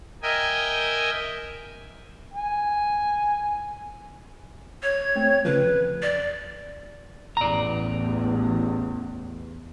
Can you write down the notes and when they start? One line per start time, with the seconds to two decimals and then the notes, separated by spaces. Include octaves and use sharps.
0.22 A#4 D#5 E5 G5 G#5
2.34 G#5
4.83 C#5
5.15 A3 C4 G5
5.45 C#3 F3 B4
5.61 E2
6.02 D5
7.37 A1 E2 D5 A#5